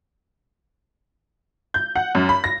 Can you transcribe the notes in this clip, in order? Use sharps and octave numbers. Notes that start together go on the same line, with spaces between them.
G6
F#5
F#2
B5
A#6